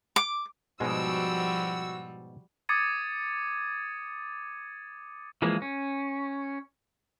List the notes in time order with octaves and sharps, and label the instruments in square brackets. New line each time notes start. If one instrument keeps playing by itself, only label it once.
[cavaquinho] D6
[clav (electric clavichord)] G#2 B2 G#3 [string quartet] F3 G3 [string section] F#4 E6
[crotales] D6 D#6 G#6 A6 C#7 D#7
[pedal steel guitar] E3 F3 G#3 A#3
C#4